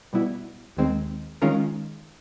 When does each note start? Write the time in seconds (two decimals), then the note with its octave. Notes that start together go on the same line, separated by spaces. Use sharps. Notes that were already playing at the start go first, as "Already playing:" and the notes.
0.13 B2 G3 B3 E4
0.76 D#2 D#3 G#3 C4
1.42 D#3 G#3 C#4 F4 A#4